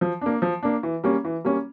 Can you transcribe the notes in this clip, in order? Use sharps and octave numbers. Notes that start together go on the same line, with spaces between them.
F3
A#3 D4
F3
A#3 D4
E3
G3 A#3 C#4
E3
G3 A#3 C#4